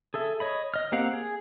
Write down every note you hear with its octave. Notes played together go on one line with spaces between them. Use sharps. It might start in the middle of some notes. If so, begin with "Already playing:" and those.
G#4 A4 E5
C#5 D#5 B5
D#5 F6
A#3 C4 G4 F5 F#5
G#4